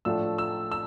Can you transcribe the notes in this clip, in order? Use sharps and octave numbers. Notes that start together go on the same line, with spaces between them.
A2 F3 A3 D4 F4 E6
E6
E6